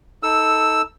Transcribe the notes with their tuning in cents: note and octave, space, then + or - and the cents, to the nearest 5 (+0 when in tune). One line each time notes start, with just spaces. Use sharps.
D#4 +30 A4 +5 E6 +0